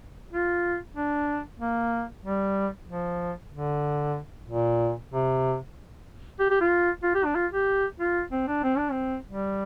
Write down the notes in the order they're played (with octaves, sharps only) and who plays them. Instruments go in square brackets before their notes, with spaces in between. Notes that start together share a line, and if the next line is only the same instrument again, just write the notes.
[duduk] F4
D4
A#3
G3
F3
D3
A#2
C3
G4
G4
F4
F4
G4
D4
F4
G4
F4
C4
D4
C4
D4
C4
G3